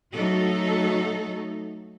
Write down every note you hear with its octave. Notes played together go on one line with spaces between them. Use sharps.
F#3 A3 D#4 F#4 A4